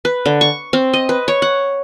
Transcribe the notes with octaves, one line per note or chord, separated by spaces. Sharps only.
B4
D3
C#6
C4
D#5
B4
C#5
F#5